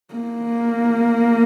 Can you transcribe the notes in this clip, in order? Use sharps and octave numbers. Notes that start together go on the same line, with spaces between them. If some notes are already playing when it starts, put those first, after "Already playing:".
A#3